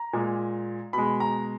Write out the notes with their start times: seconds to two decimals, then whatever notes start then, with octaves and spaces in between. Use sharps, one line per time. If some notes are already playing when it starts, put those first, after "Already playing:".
Already playing: A#5
0.13 A#2 G#3
0.93 B2 G#3 B5
1.20 A#5